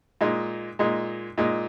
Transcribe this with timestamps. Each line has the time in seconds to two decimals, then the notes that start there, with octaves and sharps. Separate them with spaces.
0.21 A#2 G#3 D#4
0.79 A#2 G#3 D#4
1.38 A#2 G#3 D#4